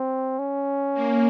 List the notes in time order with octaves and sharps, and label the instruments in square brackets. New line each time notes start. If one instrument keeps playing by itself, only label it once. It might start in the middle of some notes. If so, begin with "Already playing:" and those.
Already playing: [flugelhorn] C4
C#4
[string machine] A#3